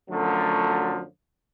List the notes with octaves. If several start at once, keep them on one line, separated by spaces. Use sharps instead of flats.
F#2 D3 F3 F#3 A3